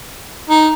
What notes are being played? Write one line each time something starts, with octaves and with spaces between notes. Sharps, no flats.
D#4